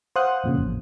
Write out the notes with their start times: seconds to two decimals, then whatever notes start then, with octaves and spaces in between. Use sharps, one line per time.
0.16 C5 F5 F#5 D#6 F#6
0.43 F2 A#2 C#3
0.58 A1 F2